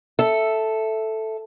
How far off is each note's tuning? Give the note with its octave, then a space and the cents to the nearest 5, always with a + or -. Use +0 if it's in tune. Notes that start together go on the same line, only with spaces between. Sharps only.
A4 +0 E5 +0